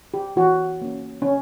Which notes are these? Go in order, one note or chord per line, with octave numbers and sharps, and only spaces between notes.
G4
E3 F#4
A#3 C#4
C#4